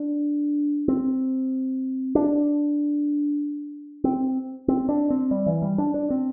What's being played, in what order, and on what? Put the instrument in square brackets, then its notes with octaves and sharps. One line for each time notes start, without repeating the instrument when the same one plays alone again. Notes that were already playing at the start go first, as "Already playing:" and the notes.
Already playing: [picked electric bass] D4
C4
D4
C4
C4
D4
C4
G3
E3
G3
D4
D4
C4